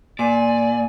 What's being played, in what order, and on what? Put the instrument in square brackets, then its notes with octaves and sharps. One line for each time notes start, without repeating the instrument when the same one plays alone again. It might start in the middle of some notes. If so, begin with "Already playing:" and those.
[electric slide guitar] A#2 [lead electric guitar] D5 [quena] G#5